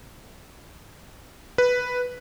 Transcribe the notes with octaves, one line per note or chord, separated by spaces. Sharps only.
B4